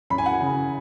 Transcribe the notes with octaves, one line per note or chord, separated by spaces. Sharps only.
F#2 B5
G#5
F#5
G#5
C#3